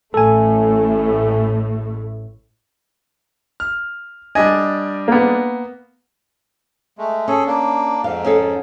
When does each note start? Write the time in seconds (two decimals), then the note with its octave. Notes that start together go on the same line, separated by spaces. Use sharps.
0.14 A1 A2 A3 A4 G#5
3.60 F6
4.35 G3 D4 D#5 G#5
5.08 A#3 B3
6.98 G#3 A3
7.28 C#4 G#4 A4
7.47 A#3 D4
8.04 F2 G#2 F5
8.24 C#4 G#4 A4